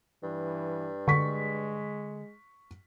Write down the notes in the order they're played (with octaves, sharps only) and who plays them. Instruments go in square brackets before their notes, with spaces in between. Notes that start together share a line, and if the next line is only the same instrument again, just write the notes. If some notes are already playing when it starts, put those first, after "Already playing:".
[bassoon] G2 [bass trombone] E3
[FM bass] D3 [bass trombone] G#3 [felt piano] C#6 B6